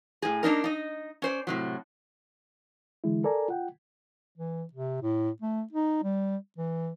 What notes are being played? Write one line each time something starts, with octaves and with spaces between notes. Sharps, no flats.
A2 G#4
A#3 D4 D#4 A#4
D#4 D#5
C#4 C5 D5
A2 C3 F#3
D3 E3 G#3 E4
A4 A#4 D5 G#5 A#5
F4 F#5 G5
E3
C3
A2
A3
D#4
G3
E3